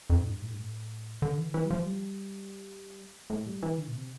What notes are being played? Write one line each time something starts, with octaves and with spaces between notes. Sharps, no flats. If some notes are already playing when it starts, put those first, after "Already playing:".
F2
A2
G2
A2
G2
A2
D3
E3
E3
G3
F3
G3
A2
G3
E3
D3
A#2
C3